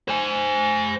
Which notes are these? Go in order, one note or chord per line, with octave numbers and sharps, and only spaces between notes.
C5 G#5